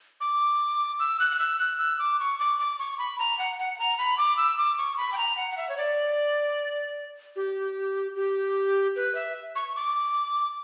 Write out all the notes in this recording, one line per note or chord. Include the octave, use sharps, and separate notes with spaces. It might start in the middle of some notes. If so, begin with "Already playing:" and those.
D6
E6
F#6
F#6
E6
F#6
E6
D6
C#6
D6
D6
C#6
B5
A#5
F#5
F#5
A#5
B5
D6
E6
D6
C#6
B5
G5
A#5
F#5
F#5
E5
C#5
D5
G4
G4
B4
E5
C#6
D6